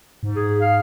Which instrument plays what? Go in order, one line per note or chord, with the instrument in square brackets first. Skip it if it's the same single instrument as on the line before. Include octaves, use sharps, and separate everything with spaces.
[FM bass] G#2
[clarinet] G#4
F5